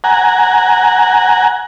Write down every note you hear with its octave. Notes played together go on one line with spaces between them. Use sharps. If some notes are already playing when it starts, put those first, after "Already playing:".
F#5 G#5 A#5